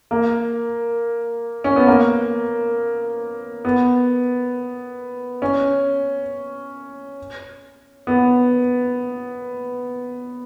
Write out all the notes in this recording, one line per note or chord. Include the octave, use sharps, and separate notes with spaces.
A#3
C#4
B3
A#3
B3
C#4
B3